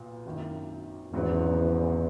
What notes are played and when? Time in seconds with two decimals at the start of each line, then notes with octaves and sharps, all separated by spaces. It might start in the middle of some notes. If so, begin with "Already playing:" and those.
Already playing: B1 A#2
0.26 G#1 F#2 D#3 A#3 E4
1.13 G#1 E2 G#2 F#3 C#4